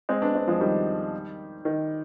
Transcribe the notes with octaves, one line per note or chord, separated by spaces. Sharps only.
G#3 C4
B3 D4
G#3 C4
F3 G#3
D#3 G3
D#3